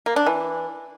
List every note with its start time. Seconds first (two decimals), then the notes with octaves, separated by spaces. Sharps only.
0.06 A#3
0.16 D4
0.26 E3